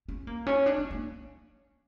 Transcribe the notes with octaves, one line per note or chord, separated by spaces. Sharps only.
C#4
A#3
C#4
D4
C#4
A#3